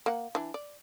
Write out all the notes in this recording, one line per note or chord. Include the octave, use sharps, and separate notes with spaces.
A#3 F#5
E3 D4
D5